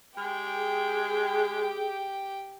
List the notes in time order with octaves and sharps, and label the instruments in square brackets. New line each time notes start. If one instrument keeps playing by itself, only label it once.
[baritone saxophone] G#3 [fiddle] G4 G5
[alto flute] G#4